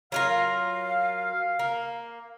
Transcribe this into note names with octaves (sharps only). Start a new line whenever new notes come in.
F#3 F4 A#4 F5
A#3